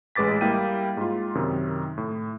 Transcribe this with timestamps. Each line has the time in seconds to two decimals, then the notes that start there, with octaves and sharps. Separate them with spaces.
0.15 A1 G#3 B4 D6 A6 B6
0.41 G3 A#3 E4 F5 G5 D#7
0.97 G#2 F4
1.35 F#2 C3 D#3
1.98 A2